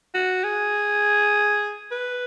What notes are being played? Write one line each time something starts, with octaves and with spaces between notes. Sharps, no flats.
F#4
G#4
B4